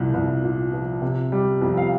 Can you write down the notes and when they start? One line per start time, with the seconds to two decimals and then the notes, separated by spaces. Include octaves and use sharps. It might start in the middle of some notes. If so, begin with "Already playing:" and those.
Already playing: C2 A#2 F3
0.14 C2
0.43 A#2
0.73 F3
1.02 C3
1.32 G3
1.61 F2
1.77 F5